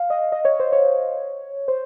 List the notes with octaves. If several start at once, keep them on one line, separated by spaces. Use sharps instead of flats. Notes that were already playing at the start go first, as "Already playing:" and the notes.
Already playing: F5
D#5
D#5
C#5
C5
C#5
C5